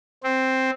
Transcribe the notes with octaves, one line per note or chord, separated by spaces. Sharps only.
C4